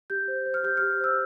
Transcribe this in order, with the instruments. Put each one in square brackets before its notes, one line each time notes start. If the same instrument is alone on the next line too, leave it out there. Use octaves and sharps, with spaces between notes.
[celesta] G4 G6
C5
C5
F6
G4 G6
F6
G4
C5 E6